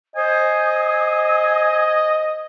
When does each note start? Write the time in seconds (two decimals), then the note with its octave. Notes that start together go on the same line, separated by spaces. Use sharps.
0.16 C5 D#5 G#5 D#6